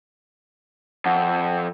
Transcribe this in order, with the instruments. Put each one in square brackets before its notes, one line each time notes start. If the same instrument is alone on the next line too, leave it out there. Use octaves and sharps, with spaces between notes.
[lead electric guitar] F2 [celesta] F#5